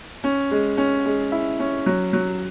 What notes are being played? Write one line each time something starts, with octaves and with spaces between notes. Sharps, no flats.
C#4
G#3
C#4
G#3
E4
C#4
F#3
F#3